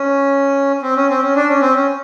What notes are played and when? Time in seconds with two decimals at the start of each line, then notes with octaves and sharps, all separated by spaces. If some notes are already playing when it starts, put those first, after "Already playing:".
Already playing: C#4
0.82 C4
0.96 C#4
1.09 C4
1.22 C#4
1.36 D4
1.49 C#4
1.62 C4
1.75 C#4